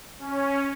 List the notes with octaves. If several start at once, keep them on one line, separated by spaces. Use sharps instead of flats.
C#4